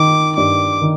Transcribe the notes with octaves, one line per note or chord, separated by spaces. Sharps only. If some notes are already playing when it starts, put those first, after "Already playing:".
Already playing: D#3 D6
G2 D6
D#3